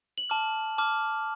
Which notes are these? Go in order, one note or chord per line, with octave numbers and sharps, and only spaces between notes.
F#7
A5 D6 F6
A5 D6 F6